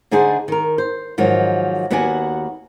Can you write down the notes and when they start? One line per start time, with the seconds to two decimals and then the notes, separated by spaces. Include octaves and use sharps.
0.11 D3 D4 D#4 G#4 B4 C5
0.48 D#3 A#4
0.78 C5
1.18 G#2 D#3 F3 F#3
1.91 D#2 B3 F#4 D5 F#5 G#5